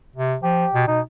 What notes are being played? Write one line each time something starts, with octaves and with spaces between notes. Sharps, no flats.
C3
F3 G4
B2
B2 D#4